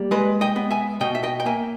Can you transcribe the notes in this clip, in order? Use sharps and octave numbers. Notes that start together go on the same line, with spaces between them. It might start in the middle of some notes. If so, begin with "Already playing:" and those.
Already playing: G3 A#3
G#3 B4 D#5
D#5 G5
B3
E5 G#5
B2 D#5 G5
E5
D#5 G5
G5
A#3 E5 G#5